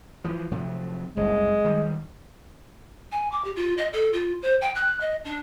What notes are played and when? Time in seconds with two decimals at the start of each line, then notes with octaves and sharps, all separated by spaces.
0.24 E3 F3
0.52 C3 F3 F#3
1.17 F#1 C2 G#3
1.65 D#3 G3
3.11 G#5
3.31 D6
3.44 G4
3.56 F4
3.77 D#5
3.92 A4
4.13 F4
4.42 C5
4.61 G5
4.75 F#6
5.00 D#5
5.24 D4